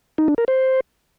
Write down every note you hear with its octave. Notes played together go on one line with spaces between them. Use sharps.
D#4
D4
A#4
C5